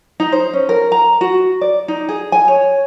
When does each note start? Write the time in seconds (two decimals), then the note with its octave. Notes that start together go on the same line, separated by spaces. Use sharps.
0.20 D#4
0.32 C5
0.53 C#4
0.69 A#4
0.92 A#5
1.21 F#4
1.61 D5
1.88 D#4
2.09 G#4
2.32 G#5
2.48 C#5